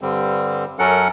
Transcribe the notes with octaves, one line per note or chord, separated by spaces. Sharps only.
G2 D3 G3 C4
F#2 F#3 C#4 A4 A#4 F#5